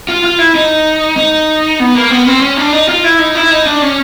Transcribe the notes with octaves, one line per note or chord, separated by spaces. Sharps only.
F4
F4
E4
D#4
D#4
B3
A#3
B3
C4
C#4
D4
D#4
F4
E4
D#4
E4
D#4
D4
C#4